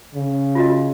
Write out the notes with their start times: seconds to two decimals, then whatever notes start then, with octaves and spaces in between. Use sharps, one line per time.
0.15 C#3
0.55 F4 F#4 D#5